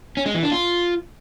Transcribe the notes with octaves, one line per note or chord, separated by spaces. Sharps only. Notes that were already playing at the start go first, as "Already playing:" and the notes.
C#4
G#3
E3
D4
F4